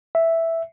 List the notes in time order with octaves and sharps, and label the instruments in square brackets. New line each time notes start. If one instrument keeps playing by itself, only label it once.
[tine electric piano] E5